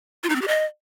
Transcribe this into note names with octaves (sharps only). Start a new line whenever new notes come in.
F4
D#4
C4
G4
D#5